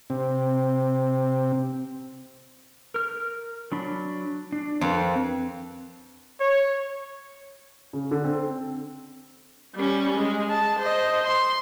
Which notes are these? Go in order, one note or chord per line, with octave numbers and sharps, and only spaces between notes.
C3 C4
A#4 F6
F#3 D4 B5
D4
F2 C4 A#4 B4
C#5
C#3
D3
C4
G3 C#4
G#3
A5
C5 D#5
C6